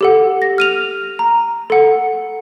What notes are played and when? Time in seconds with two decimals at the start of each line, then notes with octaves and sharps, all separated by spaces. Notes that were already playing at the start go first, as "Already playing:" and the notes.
0.01 G4 A4 F#5
0.42 A#6
0.58 F6 D#7 F7
1.19 A#5
1.70 A4 F#5